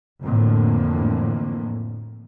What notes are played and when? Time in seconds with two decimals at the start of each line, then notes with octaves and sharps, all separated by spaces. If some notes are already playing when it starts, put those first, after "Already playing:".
0.24 F2 A2 D3 E3 A#3